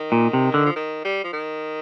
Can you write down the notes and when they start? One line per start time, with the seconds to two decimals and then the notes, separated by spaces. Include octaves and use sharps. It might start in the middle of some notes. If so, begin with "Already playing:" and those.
Already playing: D#3
0.12 A#2
0.33 C3
0.54 D3
0.66 F3
0.76 D#3
1.05 G3
1.24 F3
1.33 D#3